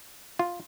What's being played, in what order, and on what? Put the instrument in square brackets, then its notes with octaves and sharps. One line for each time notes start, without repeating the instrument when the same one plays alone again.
[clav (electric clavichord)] F4